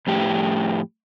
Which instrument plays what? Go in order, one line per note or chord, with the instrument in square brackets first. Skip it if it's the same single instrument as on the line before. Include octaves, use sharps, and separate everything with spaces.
[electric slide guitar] F2 A2 G4